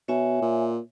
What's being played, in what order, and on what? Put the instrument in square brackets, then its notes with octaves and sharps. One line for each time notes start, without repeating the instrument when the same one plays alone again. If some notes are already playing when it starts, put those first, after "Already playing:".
[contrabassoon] B2 [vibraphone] C#5 E5 G#5
[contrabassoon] A#2